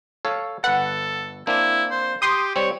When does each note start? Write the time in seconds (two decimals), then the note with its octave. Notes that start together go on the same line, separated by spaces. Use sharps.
0.25 A4 C#5 F5
0.64 G1 A4 B4 F#5
1.47 A#3 C4 D4 E4
1.91 C5
2.22 G4 C6 D#6
2.56 G3 C4 C#5